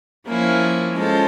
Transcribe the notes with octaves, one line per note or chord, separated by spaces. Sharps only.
F3 A#3 C#4 E4
G#3 C#4 F4 A4 C5